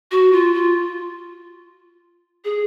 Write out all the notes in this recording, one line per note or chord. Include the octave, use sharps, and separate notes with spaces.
F#4
F4
F4
G#4